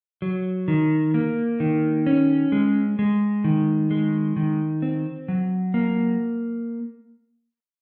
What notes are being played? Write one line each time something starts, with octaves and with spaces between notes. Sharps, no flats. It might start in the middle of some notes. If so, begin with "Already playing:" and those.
F#3
D#3
A#3
D#3
C#4
G#3
G#3
D#3
G#3
D#3
C4
F#3
A#3